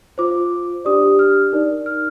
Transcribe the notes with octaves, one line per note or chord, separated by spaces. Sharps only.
F4 C5 D6
D4 G4 D5 D#6
F6
D#4 A#4 D5
F6